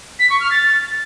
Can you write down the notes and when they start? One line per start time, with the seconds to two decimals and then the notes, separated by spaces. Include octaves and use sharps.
0.19 B6
0.30 C#6
0.40 F6
0.51 A6